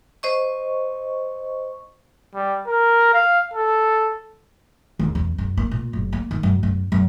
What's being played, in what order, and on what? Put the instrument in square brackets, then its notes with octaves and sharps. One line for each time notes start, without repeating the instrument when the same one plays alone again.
[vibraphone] C5 D#5 C#6
[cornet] G3
A#4
F5
A4
[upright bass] D#2
E2
F#2
A#3
A#2
F#1
A#3
D#3
F#2
F#2
F#2